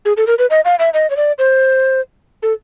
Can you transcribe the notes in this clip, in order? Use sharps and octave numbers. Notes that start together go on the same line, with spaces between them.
G#4
A4
A#4
B4
D#5
F5
E5
D#5
C#5
D5
C5
A4